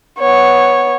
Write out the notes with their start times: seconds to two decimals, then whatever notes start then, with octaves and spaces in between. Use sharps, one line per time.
0.19 B3 C#5